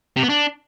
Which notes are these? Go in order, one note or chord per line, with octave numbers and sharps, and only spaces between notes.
C3
B3
D4